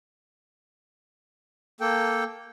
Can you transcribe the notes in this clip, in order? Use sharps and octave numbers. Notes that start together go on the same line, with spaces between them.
A#3 A4 G5